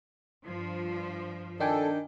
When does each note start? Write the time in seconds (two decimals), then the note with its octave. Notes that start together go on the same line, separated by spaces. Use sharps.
0.45 G2 F3
1.60 D#3 D4 A4 G5 G#5